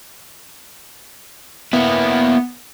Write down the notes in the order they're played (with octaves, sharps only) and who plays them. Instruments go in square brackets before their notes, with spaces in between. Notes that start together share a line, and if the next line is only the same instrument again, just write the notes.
[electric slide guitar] A#3 E4 [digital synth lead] B3